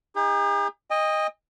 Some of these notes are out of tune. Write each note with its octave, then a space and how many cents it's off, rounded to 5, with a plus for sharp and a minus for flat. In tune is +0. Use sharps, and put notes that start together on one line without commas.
D#4 +20 G#4 -45
D#5 +0 G5 +45